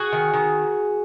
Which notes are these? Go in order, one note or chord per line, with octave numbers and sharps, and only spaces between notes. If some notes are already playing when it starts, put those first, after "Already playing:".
Already playing: F#4 G#4
D#3
D#3